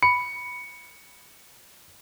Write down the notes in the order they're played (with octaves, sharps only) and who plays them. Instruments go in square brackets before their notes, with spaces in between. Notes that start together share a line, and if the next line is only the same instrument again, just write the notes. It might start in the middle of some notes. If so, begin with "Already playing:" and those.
[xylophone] B5 [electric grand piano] C#7